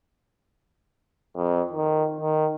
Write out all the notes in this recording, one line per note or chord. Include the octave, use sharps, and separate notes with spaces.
F2
D#3
D#3